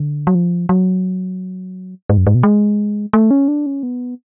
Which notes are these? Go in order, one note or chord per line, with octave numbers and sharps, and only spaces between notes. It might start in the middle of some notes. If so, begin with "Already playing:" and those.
Already playing: D3
F#3
F3
F#3
G#2
F#2
G#2
B2
G#3
A3
C#4
D4
C#4
B3